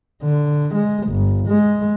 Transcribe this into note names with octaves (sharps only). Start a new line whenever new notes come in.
D3
G#3
G1
G#3